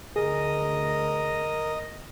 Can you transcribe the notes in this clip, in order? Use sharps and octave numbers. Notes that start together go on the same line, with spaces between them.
D2 G#4 A#4 D#5 D#6